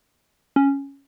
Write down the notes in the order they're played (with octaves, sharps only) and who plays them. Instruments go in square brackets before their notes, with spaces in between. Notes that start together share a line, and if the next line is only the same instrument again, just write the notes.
[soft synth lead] C#4